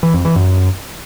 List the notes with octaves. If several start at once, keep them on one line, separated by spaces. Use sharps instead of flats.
E3
F2
E3
F#2